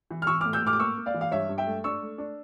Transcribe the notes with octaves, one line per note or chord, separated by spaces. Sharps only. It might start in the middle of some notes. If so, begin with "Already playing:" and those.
E3
F6
E3 C#6 E6
A2 D6 F6
E6 G6
A2 D6 F6
D6
A#3 C#6 E6
A#3
D5 F5
E3
F5
G2 C#5 E5
G2
E5 G5
A3
D4 C#6 E6
A3
D4